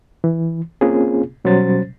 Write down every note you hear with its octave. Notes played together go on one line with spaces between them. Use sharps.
E3
A#3 C4 C#4 F4 G#4
B2 F#3 G3 C#4 C5 A6